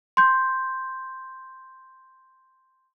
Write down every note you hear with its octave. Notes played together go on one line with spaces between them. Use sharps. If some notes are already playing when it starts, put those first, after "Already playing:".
C6 G6